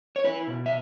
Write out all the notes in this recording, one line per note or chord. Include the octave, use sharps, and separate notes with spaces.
C#5
E4 B4
B2
E5